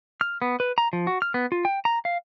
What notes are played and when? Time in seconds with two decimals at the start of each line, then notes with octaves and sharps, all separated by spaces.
0.21 F6
0.42 B3
0.60 B4
0.78 A#5
0.93 F3
1.07 F#4
1.22 F6
1.34 B3
1.52 F4
1.65 G5
1.85 A#5
2.05 F5